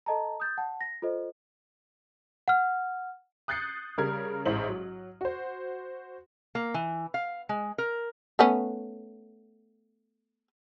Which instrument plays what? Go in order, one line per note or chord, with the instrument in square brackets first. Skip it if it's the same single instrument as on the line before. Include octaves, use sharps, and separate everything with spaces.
[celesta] A4 D#5 A5 A#5
D#6 G6 A6
F#5 A5
A#6
F4 A4 C5 D#5
F#5 F6
[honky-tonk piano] D#6 F#6 G6 A6 C7 C#7
C#3 G3 A#4 F6 G#6
A1 G#2 E4 C5 F#7
F#3
F#4 C5
[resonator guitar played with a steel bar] A#3
E3
F5
G#3
A#4
[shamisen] A3 B3 C#4